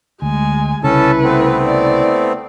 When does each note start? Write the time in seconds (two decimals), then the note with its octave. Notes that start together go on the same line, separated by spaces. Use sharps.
0.22 D2 G#3 G#5
0.84 C2 C#3 C#4 E4 A4 B4 A5
1.24 A3 B3 C4
1.63 E4 D5